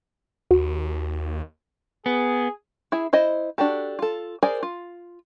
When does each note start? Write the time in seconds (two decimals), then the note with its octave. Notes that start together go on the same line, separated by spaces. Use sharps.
0.51 D#2 F#4
2.06 B3 G#4
2.92 E4 G#4 E5
3.13 E4 C5 D#5
3.58 D4 F#4 G4 A4
3.99 F4 A4
4.43 G#4 A#4 C5 D5 G#5
4.63 F4